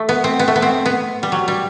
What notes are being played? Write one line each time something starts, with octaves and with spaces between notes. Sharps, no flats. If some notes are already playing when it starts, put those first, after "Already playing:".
Already playing: A3
B3
C4
B3
A3
B3
C4
B3
G3
F#3
G3